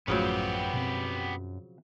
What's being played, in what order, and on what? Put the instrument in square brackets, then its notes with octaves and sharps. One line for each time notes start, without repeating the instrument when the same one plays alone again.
[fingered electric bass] A1 A3 [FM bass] F#2 [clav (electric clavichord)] C#3 F3 F#3 [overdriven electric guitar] B3 G4
[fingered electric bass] B2 C4